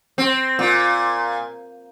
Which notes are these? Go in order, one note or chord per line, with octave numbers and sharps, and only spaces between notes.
C4
A#2